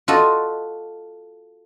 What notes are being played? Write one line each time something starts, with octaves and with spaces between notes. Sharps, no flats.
F4 F#4 A4 D#5